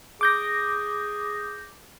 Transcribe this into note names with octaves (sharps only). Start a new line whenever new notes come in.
G#4 D6 G6 A#6